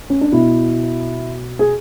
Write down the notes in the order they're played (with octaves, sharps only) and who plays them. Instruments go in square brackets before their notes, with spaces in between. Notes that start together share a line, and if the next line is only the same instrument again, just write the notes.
[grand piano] C#4
D4
B2 E4
G#4